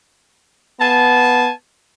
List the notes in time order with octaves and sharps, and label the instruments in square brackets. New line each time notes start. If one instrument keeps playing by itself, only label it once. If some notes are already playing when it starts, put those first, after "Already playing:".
[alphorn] B3 [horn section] F5 G#5 A5